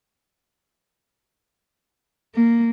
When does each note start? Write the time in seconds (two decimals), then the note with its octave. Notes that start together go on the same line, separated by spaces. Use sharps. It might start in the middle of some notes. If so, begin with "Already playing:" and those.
2.35 A#3